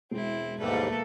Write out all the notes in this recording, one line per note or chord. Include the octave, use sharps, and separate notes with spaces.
E1 G#3 C4 E4
D#2 G#2 G3 A3 A#3 A4 B4